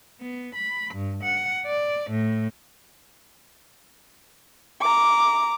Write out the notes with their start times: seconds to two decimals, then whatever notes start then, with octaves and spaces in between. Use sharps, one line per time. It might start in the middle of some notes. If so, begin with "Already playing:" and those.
0.20 B3
0.55 B5
0.94 G2
1.24 F#5
1.67 D5
2.10 A2
4.81 A#5 D6